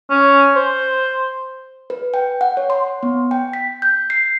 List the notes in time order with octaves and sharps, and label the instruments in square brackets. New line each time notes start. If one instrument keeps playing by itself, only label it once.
[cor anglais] C#4
C5
[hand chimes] B4
G5
F#5
C#5
C6
B3
G5
B6
G6
C7